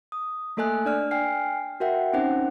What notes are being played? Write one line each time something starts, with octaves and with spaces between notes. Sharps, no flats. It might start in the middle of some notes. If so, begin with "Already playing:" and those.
D#6
A3 A#3 A4 D#5 G#5 F#6
D4 D5 F6
G5 G#5 F6 C7
F#4 A#4 E5 F#5 G5
C4 C#4 D#4 C5 F#5